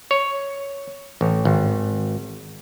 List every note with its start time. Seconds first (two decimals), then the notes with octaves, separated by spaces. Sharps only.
0.11 C#5
1.21 A1
1.45 G#1